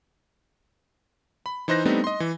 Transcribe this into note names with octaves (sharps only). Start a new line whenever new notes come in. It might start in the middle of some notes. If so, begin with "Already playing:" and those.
B5
E3 D#4 C5 F#6 A#6
G3 A3 B3 C4 D4 D#4
D#5 C6
E3